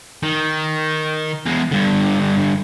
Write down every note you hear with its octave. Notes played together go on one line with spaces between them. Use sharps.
D#3
E2 G#3
G2 D3